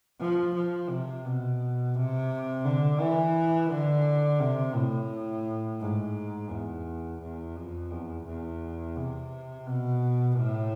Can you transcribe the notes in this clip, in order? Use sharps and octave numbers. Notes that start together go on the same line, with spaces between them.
F3
F3
C3
B2
C3
D3
E3
D3
C3
A2
G#2
E2
E2
F2
E2
E2
C3
B2
A2